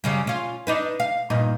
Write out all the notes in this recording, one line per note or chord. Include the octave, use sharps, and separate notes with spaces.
F#2 C#3 G3
C#4 F4
D4 D#4 B4
F5
G2 A#2 D#4